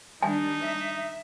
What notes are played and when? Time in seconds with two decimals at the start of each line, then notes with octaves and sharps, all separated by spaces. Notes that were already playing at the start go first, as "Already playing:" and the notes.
0.23 D#3 G3 D4 D#4 G#5
0.60 E5